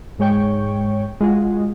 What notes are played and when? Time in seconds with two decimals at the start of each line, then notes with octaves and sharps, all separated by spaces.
0.19 G#2 G#3 C#5 G5 C#6
1.21 G#3 F4 F#4 G#4